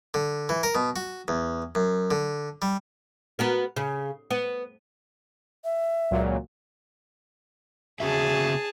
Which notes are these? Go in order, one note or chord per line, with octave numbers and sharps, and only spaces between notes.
D3
E3
A#4
B2
F#4
E2
F#2
D3
G3
B3 F#4 A#4
C#3
B3
E5
C#2 A#2 F#3
C#3 F#4 G#4 E5 A5